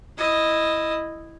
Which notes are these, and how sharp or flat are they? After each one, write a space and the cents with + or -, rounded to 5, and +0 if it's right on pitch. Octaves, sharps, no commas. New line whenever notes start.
E4 +0 D#5 +0